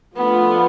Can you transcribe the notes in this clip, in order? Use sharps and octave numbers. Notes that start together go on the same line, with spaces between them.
F3 A3 B3 D4 F4